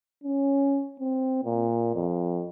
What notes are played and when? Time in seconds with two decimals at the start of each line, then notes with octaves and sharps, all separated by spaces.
0.24 C#4
1.00 C4
1.45 A#2
1.95 F2